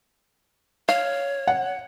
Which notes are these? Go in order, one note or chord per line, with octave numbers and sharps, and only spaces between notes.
C#5 F5
F#5